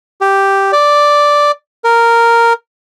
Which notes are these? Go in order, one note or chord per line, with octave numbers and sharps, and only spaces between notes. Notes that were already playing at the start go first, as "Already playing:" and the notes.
G4
D5
A#4